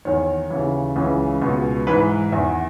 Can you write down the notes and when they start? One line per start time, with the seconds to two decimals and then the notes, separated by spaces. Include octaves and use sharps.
0.05 E2 D#3 C#5
0.50 D#2 C#3 E3
0.96 C#2 C#3 E3
1.42 C#2 B2
1.87 G#2 E3 B4
2.32 E2 D#3 E5
2.47 F#5